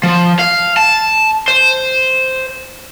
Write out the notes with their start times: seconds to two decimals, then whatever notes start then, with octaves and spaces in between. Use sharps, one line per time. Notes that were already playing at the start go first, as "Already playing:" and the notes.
0.03 F3
0.39 F5
0.77 A5
1.48 C5